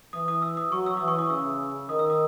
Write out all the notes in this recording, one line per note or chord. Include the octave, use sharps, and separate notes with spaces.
E3 D#6
D#6
E6
D#6
F#3 C#6
E6
E3 D#6
C#6
D#6
C#3 E6
D#3 D#6
E6
D#6